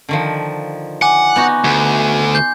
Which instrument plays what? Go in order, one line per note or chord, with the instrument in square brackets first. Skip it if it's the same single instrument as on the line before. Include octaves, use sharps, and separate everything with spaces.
[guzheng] D3 D#3 F3
[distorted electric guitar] F#5 [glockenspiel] G#5 D6
[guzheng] B3 D#4 F#4
[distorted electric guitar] D2
[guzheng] C6 [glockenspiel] G6